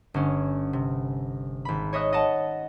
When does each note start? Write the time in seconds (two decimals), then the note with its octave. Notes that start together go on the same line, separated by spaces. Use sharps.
0.14 G1 C#4
0.73 C3
1.65 G#1 B5
1.93 C#5 D#5 E5 D#6 F#6
2.13 D#5 F#5 A5